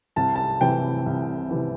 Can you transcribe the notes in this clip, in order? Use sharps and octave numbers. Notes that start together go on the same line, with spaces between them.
C2 A5
A5
C3 E3 G5
C2
C3 E3